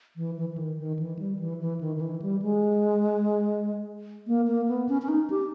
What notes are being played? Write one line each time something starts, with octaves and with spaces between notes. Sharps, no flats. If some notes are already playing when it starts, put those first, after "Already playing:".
E3
E3
E3
D#3
D#3
E3
G3
E3
E3
D#3
D#3
E3
G3
G#3
A#3
A#3
B3
C#4
C#4
D#4
G4